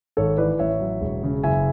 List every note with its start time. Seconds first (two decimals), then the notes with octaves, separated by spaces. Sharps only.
0.17 G#1 A4 C#5
0.38 E3 B4 D5
0.59 A1 C#5 E5
0.80 F#3
1.01 E1
1.23 C#3
1.44 F#1 E5 G#5